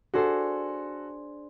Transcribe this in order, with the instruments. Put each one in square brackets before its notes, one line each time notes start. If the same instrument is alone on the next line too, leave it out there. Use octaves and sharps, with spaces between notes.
[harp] D4 G#4 C5 [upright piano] F#4 A4